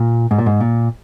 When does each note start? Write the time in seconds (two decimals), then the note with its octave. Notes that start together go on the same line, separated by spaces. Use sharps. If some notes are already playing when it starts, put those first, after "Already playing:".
Already playing: A#2
0.31 G#2
0.38 A#2
0.46 G#2
0.60 A#2